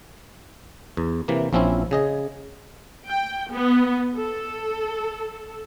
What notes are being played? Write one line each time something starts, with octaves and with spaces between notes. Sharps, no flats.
E2
C3 E3 A#3
A#1 F3 C4 C#4 E4
C#3 G#4 D#5
G5
B3
A4